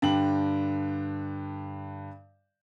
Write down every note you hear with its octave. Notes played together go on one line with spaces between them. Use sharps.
G2 D3 G5 F#7